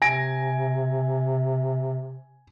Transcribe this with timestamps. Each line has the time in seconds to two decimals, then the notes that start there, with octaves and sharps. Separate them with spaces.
0.02 C3 G#5 A#6 D7